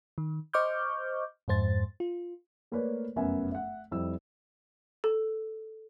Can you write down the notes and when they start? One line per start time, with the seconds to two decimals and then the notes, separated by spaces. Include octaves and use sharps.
0.18 D#3
0.54 C5 D#5 C#6 D6 F6 G6
1.48 F2 G#2 C5 A6
2.00 F4
2.72 A3 A#3 A#4 B4 C#5 D5
3.16 F1 F#2 B3 A#4 E5 G#5
3.52 E5 F#5
3.91 F2 G3 C4 E4 E6
5.04 A4